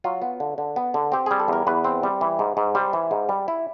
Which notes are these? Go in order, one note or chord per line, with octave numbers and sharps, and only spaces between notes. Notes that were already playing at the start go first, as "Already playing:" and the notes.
F#3 F4
B3
D3
D3
B3
D3
C4 G4
G3 G#4
A4
E2 A#4
E2 B4
C4
G3
E3
G#2
G#2
G3 C5
E3
G#2
G3
E4